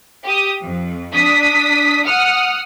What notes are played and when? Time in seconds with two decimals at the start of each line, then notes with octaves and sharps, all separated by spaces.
0.24 G4 D#6
0.62 F2
1.14 D4 D#6 B6
2.05 F#5 D#6 F6